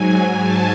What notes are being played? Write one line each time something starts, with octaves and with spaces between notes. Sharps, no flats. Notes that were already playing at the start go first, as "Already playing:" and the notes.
Already playing: G#2 F#3 G#5
A5